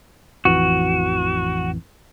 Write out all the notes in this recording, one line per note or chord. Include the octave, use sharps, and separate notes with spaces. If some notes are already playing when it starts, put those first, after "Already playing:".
A1 F2 E3 F#4